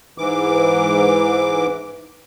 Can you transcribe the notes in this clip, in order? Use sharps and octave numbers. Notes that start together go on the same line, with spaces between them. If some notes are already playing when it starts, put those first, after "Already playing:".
G#2 E3 D6